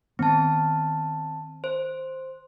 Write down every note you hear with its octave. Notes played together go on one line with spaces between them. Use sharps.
D#3 B3 C4 A5
C5